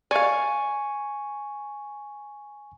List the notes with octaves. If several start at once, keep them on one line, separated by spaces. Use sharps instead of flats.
D5 F5 G#5 C#6